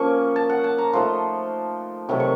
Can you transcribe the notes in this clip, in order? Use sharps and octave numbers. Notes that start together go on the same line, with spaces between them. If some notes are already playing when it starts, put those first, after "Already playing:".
Already playing: F3 A#3 C#4 C#6
A5
F#5
A5
A#5
F3 A3 D#4 C6
C3 D#3 F#3 A3
C#6